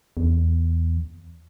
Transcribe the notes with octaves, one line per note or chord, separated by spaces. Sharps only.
E2